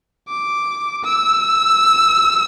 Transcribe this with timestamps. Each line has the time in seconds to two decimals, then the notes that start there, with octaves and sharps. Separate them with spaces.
0.29 D6
1.04 E6